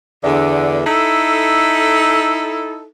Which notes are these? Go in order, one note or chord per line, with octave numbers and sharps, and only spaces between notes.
E2 D3
D#4 E4 A4